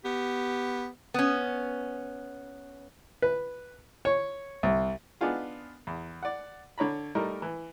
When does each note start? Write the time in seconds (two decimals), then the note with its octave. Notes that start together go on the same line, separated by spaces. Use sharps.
0.05 B3 G4
1.14 B3 C#4
3.22 B4
4.05 C#5
4.63 C2
5.21 B3 D4 D#4 F4 G#4
5.87 E2
6.23 D5 F#5
6.78 D3 C#5 A#5 B5
7.15 G3 A3 D#4 A#4
7.42 E3